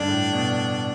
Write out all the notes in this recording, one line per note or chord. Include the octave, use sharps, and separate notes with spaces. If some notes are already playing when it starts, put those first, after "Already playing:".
Already playing: G2 D3 D4
A2
B2